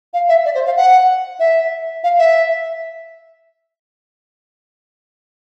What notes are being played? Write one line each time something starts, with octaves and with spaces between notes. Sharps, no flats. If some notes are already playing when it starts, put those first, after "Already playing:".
F5
E5
D5
C5
F5
F#5
E5
F5
E5